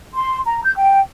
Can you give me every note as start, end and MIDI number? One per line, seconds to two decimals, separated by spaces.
0.15 0.39 84
0.46 0.62 82
0.64 0.75 91
0.76 0.99 79